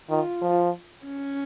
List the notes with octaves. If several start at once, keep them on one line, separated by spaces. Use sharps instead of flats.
D#3 F4
F3
C#4